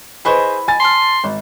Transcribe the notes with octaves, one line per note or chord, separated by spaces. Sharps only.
E4 G#4 B4 C5 D#5 C#6
G#5 A6
A5 C6 F6
G#1